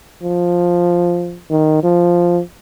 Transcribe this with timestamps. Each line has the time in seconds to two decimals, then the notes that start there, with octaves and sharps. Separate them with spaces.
0.23 F3
1.51 D#3
1.83 F3